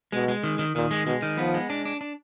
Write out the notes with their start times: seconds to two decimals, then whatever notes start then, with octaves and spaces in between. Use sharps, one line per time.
0.12 B2 G#3
0.28 G#3
0.43 D#3
0.59 D#3
0.75 A#2 D#3
0.91 G#3
1.06 B2 G#3
1.22 D#3
1.37 F3 B3
1.54 G#3
1.70 D4
1.85 D4
2.01 D4